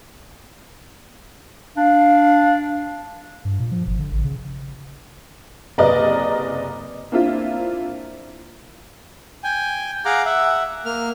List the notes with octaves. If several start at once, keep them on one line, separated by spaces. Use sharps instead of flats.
D4 F5
G2
A#2
F3
G1
D3
A1
C#3
F#1 C3 A#4 B4 D5 D#5
A#3 C4 D4 E4 F4
G5 G#5
G#4 F5 F#5 A#5 D6
E5 F#5
A#3 F6